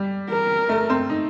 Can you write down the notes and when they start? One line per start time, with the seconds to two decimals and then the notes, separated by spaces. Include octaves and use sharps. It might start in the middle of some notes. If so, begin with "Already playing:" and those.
Already playing: G3
0.30 A#4
0.69 A3
0.90 C4
1.10 D#4